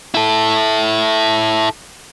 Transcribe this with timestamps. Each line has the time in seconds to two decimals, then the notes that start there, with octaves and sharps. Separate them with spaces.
0.14 E4 A4